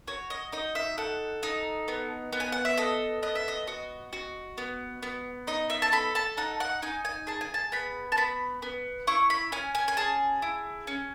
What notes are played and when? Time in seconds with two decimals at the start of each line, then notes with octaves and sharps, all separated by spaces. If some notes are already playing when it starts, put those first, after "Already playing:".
0.08 F#4 C#5
0.30 D#5
0.52 D#4 D#5
0.75 E5
0.98 A4 F#5
1.43 D#4
1.88 B3
2.32 B3
2.40 G#5
2.52 F#5
2.65 E5
2.78 A4 D#5
3.22 B3 D#5
3.35 E5
3.48 D#5
3.67 F#4 D#5
4.13 F#4
4.58 B3
5.02 B3
5.47 D#4 D#5
5.70 E5
5.82 A5
5.92 A4 B5
6.15 A5
6.37 D#4 F#5
6.60 F#5
6.82 D#4 G#5
7.05 G#5
7.27 G#4 A5
7.41 G#5
7.54 A5
7.72 B3 B5
8.12 A5
8.17 B3 B5
8.62 B3
9.07 E4 C#6
9.30 B5
9.52 C#4 G#5
9.75 G#5
9.88 G#5
9.97 G#4 A5
10.42 E4
10.87 C#4